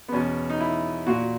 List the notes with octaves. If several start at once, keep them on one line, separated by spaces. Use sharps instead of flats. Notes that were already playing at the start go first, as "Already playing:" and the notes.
B3
E2 B2 C#4
D#4
E4
A#2 F#4